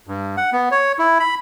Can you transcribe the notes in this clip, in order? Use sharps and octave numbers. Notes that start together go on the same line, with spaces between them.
G2
F#5
B3
C#5
E4
B5